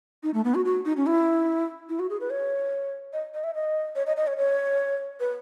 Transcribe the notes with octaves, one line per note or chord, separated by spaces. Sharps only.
D#4
A3
B3
F#4
F#4
D#4
C#4
E4
E4
F#4
G#4
B4
C#5
D#5
D#5
E5
D#5
C#5
D#5
D#5
C#5
C#5
B4